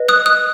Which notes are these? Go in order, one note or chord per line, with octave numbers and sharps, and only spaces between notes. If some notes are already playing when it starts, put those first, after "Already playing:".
Already playing: B4 D#5
D#6 F#6
D#6 F#6